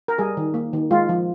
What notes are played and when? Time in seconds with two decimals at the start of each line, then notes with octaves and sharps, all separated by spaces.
0.08 A#4
0.18 G3 G#4
0.37 D#3
0.54 A#3
0.73 D#3
0.91 G#3 F4
1.09 F3